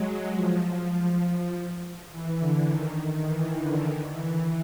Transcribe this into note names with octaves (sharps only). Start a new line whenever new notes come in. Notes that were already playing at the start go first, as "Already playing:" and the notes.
Already playing: F#3 G#3
F3
F3
E3
D3
D#3
E3
D3
D#3
E3